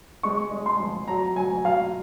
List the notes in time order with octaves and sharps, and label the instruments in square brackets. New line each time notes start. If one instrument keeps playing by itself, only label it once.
[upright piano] G#3 C#6
G#3
C6
F3
F#3 A#5
F#3 G#5
F#3 F5